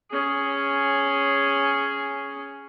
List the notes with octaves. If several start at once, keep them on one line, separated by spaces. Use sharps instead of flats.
C#4 G#4